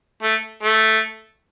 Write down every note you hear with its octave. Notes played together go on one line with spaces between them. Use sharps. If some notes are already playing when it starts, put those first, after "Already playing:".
A3
A3